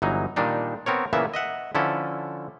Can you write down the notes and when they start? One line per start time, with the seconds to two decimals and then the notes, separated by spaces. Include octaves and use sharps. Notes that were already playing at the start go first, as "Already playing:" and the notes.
0.02 G1 E3 F#3 D#4
0.36 A#2 D#3 G3 D4 D#4
0.86 B3 C4 A#4 C#5
1.13 A#2 C#3 E3 A#3 B3 E5
1.34 D#5 E5 F#5
1.75 D3 F3 C#4 E4 A4